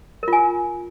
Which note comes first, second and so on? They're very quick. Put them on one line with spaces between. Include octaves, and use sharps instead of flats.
A#4 F4 G#5